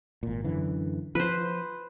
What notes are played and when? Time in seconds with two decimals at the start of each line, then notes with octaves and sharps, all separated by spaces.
0.23 G#1 A#2
0.44 F#2 D3 E3
1.15 F3 B4 C5